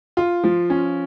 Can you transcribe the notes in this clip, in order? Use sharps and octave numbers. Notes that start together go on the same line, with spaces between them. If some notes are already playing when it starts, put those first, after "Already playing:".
F4
F3
C#4